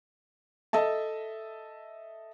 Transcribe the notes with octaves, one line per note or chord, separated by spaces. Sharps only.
A4 D#5 E5 A5